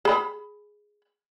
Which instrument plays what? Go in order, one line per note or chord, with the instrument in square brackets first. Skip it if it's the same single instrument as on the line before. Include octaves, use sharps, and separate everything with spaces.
[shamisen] G#4 B5